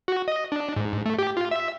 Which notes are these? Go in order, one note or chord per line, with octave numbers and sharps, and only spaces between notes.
F#4
D#5
D4
G#2
A3
G4
F4
E5